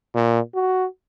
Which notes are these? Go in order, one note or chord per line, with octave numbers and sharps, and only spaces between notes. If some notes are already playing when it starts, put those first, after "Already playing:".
A#2
F#4